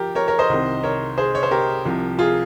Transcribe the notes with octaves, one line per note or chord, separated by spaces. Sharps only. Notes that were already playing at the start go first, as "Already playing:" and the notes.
Already playing: F3 G4 A#4
A#4 C#5
A#4 C#5
C5 D#5
C2 C3 D#3
A#4 C#5
G#4 C5
C#5
C5
G4 A#4
C2 C3 F3
F4 G#4